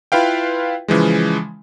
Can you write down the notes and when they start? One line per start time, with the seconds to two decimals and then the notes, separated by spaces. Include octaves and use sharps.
0.12 E4 F4 B4 F5 G5
0.88 C#3 E3 F3 G#3